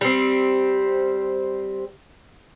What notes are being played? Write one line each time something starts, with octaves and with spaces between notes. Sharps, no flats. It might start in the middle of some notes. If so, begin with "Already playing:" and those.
G3 C4